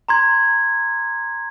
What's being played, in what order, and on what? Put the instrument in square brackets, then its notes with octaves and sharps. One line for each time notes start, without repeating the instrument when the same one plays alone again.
[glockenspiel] A#5 C6 G#6